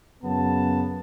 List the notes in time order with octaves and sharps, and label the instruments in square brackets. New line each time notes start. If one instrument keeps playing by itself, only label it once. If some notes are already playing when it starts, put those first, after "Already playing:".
[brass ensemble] F#2 C#3 B3 A5